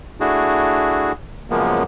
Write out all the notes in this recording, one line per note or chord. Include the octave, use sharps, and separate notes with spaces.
A3 D4 E4 F#4 G#4
F#2 C#3 F3 G#3 A#3 B3